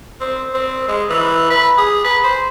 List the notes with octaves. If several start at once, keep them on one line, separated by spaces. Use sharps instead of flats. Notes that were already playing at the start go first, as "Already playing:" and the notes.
C4
C4
G#3
E3
B4
G#4
B4
C5